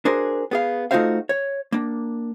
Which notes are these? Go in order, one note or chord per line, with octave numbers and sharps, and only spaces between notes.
D4 F#4 G#4 A#4 C5
B3 G#4 F5
A3 D#4 F4 F#4 C5 F5
C#5
A#3 D4